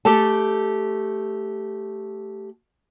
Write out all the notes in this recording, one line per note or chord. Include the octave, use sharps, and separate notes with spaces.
A3 G4 A4 A5